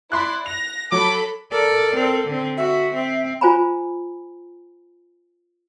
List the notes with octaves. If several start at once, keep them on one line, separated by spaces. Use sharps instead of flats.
E4 D5 B5 C6 F#6
A#6 F7
F#3 A4 B5 D6
A4 A#4 D5
C4 A4
D3 C4
F#4 E5
C4
F4 C5 G#5 A#5 B5